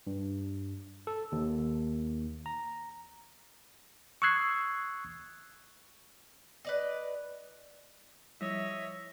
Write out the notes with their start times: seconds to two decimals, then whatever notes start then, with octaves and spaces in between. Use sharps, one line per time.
0.07 G2
1.07 A4
1.32 D#2
2.46 A#5
4.22 C#6 D#6 E6 F#6 G#6 C7
6.65 B4 D5 D#5
8.41 F3 G3 E4 C#5 D#5 E5